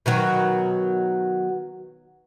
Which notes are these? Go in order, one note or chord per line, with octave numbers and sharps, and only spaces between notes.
B2 D#3 F#3